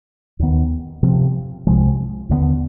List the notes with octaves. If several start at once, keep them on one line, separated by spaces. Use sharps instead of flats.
D#2 D#3 B3
C3 F3 C4
C2 C3 F3 G#3
D#2 D3 G3 B3